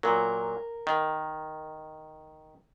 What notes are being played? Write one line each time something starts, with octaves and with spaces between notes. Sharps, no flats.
A#2 F#3 A#4
D#3